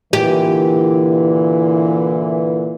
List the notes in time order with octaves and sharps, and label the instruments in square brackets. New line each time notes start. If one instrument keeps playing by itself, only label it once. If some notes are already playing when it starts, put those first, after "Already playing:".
[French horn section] A#2 D3 E3 [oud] G4